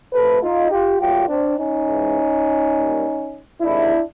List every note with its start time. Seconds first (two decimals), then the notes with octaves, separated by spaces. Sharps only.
0.13 C3 F3 A3 A4 B4
0.42 D#4 F4
0.71 F4 G4
1.00 A#2 F#3 A3 F4 G4
1.29 C4 D4
1.58 C#4 D#4
1.87 G#2 E3 G#3
2.74 A#2 G3 A#3
3.61 C3 D#3 G#3 D4 E4